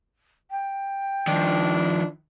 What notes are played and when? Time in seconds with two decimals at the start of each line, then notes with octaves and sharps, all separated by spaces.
0.51 G5
1.28 D#3 F3 D4